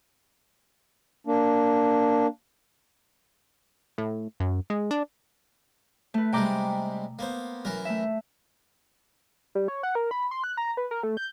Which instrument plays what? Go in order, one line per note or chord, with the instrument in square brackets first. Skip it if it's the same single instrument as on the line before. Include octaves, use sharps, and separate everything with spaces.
[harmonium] A#3 D4
[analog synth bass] A2
F#2
G#3
D4
[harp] A3 B4
[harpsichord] C3 G3 G#3 [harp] G5 A#5 D6
[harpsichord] A#3 B3 C5
F#2 E3 A#4
[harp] A3 E5
[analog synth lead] G3
C#5
F#5
A#4
B5
C6
F#6
A#5
B4
A#4
A3
G6